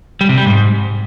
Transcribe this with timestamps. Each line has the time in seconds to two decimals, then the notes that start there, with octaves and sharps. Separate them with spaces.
0.21 G3
0.29 C3
0.37 G3
0.46 G#2